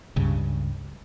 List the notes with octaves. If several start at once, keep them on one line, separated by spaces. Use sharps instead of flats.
C#2 G2 C#3